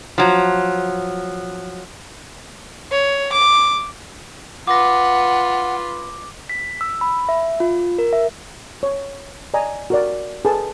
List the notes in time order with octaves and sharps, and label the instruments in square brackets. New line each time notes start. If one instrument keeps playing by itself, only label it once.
[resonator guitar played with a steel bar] F3 F#3
[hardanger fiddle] C#5
D6
[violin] F4 B4 [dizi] F#5 [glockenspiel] D6 A#6
[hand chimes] B6
E6
B5
E5
F4
A#4
E5
[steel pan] C#5
D5 D#5 G#5 A#5
F#4 A#4 D5
G#4 A4 B4 A5